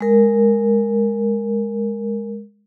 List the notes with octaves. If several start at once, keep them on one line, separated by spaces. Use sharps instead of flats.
G#3 A#4